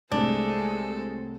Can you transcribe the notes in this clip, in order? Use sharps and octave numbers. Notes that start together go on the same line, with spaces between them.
C2 A2 G#3 A3 D4 A4 C5